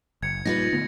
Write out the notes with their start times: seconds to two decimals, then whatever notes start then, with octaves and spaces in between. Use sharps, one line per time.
0.23 F#1 G#6 C#7
0.45 A#2 G3 D#4 F4 B4 A#6
0.73 D3 A3 B3